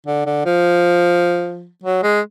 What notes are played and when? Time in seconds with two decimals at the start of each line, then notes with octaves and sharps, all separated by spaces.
0.06 D3
0.26 D3
0.45 F3
1.83 F#3
2.03 G#3